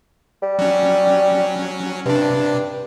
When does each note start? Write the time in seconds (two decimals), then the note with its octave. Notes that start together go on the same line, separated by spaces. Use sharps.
0.42 G3
0.59 F#3 C#4
2.06 G2 C3 D4